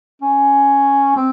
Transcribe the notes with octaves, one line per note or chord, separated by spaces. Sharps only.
C#4
C4